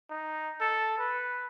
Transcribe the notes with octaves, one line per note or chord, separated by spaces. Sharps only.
D#4
A4
B4